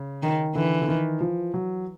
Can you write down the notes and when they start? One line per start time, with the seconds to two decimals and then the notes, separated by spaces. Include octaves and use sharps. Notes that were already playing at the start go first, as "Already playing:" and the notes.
Already playing: C#3
0.23 D#3
0.55 D3 E3
0.82 D3
0.88 D#3
1.20 F3
1.54 F#3